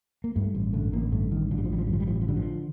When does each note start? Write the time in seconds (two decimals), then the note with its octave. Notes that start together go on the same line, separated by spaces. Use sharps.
0.24 A#3
0.36 G2 A3
0.55 A1
0.73 D3 A3
0.93 A1 A#3
1.12 G2 A3
1.32 A1 D#3
1.51 D3 F3
1.58 G3
1.65 F3
1.70 A1 G3
1.78 F3
1.87 G3
1.89 G2 F3
2.00 G3
2.07 A1 F3
2.15 G3
2.22 F3
2.28 D3 G3
2.36 F3